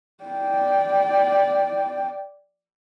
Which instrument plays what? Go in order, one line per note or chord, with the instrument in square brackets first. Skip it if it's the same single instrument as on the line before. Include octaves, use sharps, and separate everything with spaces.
[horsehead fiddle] D5 G5